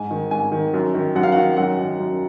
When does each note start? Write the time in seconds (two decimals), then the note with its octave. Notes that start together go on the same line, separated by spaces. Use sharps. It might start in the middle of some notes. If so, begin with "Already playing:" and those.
Already playing: G#2 G#5
0.11 D#3
0.31 G#2 G#5
0.52 D#3
0.74 F#2
0.94 D#3
1.15 F#2 F#5
1.23 F5
1.32 F#5
1.36 D#3
1.57 F#2 F#5
1.79 D#3
2.00 F#2